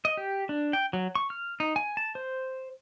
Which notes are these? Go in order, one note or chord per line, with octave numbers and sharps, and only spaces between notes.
D#5
G4
D4
G5
F#3
C#6
F6
D#4
G#5
A5
C5